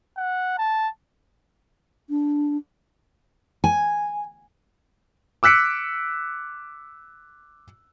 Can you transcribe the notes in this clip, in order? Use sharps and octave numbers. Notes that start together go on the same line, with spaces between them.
F#5
A5
D4
G#5
D6 E6 F#6 B6 C#7 D7